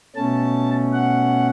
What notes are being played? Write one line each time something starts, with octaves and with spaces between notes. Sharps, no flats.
B2 A3 C#4 A5
F#5